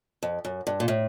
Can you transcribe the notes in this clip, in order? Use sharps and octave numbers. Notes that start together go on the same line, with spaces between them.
F2
F#2
G2
A#2
A2